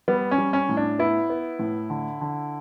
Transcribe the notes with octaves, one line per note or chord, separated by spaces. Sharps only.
G3 B3
C#4
G3
C#4
A2
D4
B3 E4
B3
A2
D3
D3